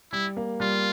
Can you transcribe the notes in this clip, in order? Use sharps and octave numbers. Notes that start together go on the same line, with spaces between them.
G3 E4
A#3
G3 F4